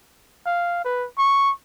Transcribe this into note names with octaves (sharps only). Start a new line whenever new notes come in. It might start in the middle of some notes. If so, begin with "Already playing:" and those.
F5
B4
C#6